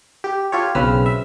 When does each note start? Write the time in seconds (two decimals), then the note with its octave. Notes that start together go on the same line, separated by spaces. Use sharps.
0.24 G4
0.52 F4 G4 A4 C#5
0.75 B1 C#3 C4 B4 E6 F6
1.06 E5